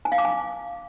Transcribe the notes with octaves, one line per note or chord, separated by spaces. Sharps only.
G#5
F5
D6
G#5